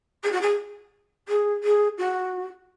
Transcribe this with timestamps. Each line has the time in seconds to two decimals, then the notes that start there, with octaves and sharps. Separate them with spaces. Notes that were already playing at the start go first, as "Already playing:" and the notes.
0.23 G#4
0.32 F#4
0.41 G#4
1.28 G#4
1.63 G#4
1.98 F#4